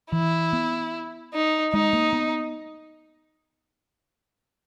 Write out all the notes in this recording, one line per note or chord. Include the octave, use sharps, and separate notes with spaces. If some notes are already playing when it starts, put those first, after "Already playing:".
E3 E4
B3
D#4
G#3 D#4
A#3
B3